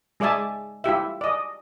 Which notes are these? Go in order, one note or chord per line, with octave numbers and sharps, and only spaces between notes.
G#3 G#4 D5 E5 G#5 A5
E4 F4 G4 E5
D5 D#5